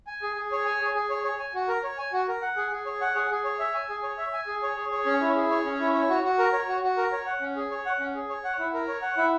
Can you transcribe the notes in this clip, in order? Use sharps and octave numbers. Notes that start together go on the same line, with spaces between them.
G#5
G#4
G#4
C#5
G#5
G#4
G#4
C#5
C#5
G#5
F#4
A#4
C#5
G#5
F#4
A#4
F#5
G#4
G#4
C#5
F#5
G#4
G#4
C#5
E5
G#5
G#4
C#5
E5
G#5
G#4
C#5
G#4
C#5
C#4
E4
G#4
C#5
C#4
E4
C#5
F#4
F#4
A#4
C#5
F#4
F#4
A#4
C#5
F#5
C#4
G#4
C#5
F#5
C#4
G#4
C#5
F#5
E4
A#4
C#5
F#5
E4